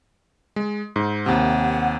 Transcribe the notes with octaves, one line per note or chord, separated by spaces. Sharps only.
G#3
G#2
D#2 C3 F#5